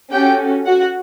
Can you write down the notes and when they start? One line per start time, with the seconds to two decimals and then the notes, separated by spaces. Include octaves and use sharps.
0.11 C#4 F#4 G4 A4 G5
0.66 F#4 F#5